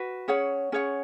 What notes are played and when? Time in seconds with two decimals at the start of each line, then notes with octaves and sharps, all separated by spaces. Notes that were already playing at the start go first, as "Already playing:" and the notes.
Already playing: F#4 B4
0.28 C#4 G#4 C#5 F#5
0.72 C#4 G#4 C#5 F#5